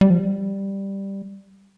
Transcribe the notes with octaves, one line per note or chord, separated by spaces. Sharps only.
G3
F3
G3